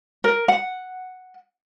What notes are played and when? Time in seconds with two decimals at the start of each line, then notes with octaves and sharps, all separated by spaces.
0.24 A#4
0.48 F#5